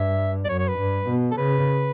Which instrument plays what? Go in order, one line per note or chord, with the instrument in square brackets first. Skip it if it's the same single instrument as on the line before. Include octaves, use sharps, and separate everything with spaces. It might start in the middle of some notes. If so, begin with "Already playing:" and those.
Already playing: [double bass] G2 [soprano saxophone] E5
[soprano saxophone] D5
[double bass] F#2 [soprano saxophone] C#5
[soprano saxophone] C#5
B4
[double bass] G2
B2
[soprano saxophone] A4
[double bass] C#3 [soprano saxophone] B4